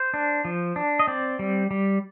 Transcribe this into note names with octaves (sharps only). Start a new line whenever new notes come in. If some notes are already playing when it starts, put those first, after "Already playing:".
Already playing: C5
D4
F3
D4
D#5
C4 D5
G3
G3